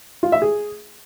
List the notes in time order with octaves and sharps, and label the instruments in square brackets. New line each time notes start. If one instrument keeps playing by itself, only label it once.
[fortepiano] F4
E5
G#4